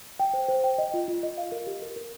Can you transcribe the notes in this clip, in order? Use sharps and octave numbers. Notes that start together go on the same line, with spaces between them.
G5
C5
C5
G5
D#5
F4
F4
D#5
F5
A#4
G4
A#4
A#4